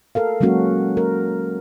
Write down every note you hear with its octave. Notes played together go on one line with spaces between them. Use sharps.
A4 A#4 F5
F#3 G#3 A#3 C#4 F#4
A#4